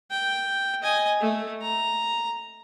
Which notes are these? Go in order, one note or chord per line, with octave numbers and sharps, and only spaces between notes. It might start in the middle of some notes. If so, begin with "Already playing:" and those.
G5
D#5 G#5
A3
A#5